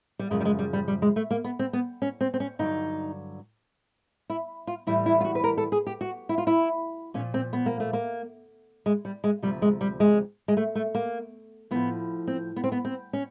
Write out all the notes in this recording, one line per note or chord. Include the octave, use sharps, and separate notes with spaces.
G3
F#2 C#3 F3 G#3
G3
G#3
G3
G3
G3
G#3
A3
A#3
B3
C4
B3
C#4
C4
C4
C#4
G2 D3 F#3 D#4
E4
F4
A2 E3 G3 E4
E4
F4
F#4
B4
A#4
A4
G#4
G4
F#4
E4
F4
E4
A#2 F3 C#4
C4
B3
A#3
A3
A#3
G#3
G3
G#3
D2 C3 F3 G3
G#3
G3
G#3
G#3
A3
A3
A#3
A2 F3 B3
C4
B3
C4
B3
C4
C#4